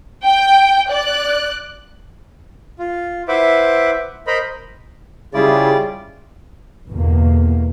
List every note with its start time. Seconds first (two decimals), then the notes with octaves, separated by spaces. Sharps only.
0.24 G5
0.90 D5 F#6
2.79 F4
3.28 E4 B4 C5 E5 F#5 D6
4.27 A#4 C5 D#5 A#5 B5
5.34 C#3 G3 E4 F4 G#4 D5
6.90 G1 E2 B2 A#3